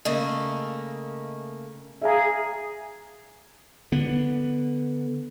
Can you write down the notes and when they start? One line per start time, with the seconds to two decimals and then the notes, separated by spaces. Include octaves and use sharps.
0.05 C#3 A3 A#3 D#5
2.01 G#4 E5 F5 A#5
3.92 D3 B3